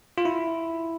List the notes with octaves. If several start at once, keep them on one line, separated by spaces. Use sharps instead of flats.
F4
E4